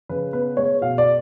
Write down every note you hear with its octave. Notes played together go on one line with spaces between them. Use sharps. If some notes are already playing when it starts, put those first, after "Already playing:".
C#3 B4
B3 B4
G#3 C#5
B2 F5
D5